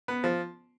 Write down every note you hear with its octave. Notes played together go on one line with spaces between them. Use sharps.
B3
F3